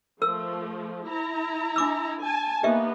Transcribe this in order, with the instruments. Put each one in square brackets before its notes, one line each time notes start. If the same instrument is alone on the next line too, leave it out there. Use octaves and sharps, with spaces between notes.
[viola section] F3 A3 [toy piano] A#4 E6
[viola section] E4 A#5
[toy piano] D4 D6 E6
[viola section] G#5 A5
[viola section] A#3 B3 D#4 [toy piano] G4 D#5 E5